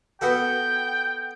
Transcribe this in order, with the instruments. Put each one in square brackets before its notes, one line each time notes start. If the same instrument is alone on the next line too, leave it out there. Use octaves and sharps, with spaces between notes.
[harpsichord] B3 F#4 A4 [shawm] G5